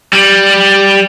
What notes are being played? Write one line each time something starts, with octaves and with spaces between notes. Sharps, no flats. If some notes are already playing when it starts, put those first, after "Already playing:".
G3